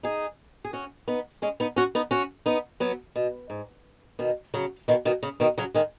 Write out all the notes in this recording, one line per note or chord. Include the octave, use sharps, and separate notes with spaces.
D#4 G#4
G#4
C#4 F#4
B3 D#4
G#3 C#4
B3 D#4
C#4 F#4
B3 D#4
C#4 F#4
B3 D#4
F#3 B3
B2
G#2
B2 D#3
C#3 F#3
B2 D#3
B2 D#3
C#3
B2 D#3
C#3 F#3
D#3 G#3